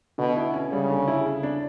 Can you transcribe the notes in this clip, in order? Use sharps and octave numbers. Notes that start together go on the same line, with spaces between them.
B2 D3
E4
C#4
C#3 G3
D3
E4
C#3
D4